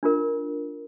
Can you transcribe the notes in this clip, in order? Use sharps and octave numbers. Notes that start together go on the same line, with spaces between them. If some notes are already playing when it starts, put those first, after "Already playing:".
D4 F4 A#4